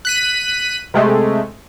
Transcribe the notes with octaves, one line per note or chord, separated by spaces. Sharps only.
F#6 B6 D#7
C3 G#3 A3